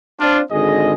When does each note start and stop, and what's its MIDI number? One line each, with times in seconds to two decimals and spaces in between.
0.20 0.41 60
0.20 0.41 62
0.20 0.41 65
0.51 0.93 32
0.51 0.93 50
0.51 0.93 68
0.51 0.93 75